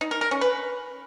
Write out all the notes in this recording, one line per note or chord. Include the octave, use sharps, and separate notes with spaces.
D#4
A#4
A#4
C#4
B4